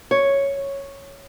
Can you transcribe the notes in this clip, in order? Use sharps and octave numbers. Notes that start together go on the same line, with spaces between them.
C#5